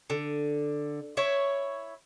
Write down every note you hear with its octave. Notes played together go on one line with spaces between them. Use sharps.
D3
E4 C#5